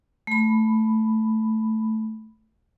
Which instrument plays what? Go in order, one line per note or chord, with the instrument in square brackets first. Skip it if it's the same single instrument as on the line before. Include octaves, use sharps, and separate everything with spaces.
[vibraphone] A3 B5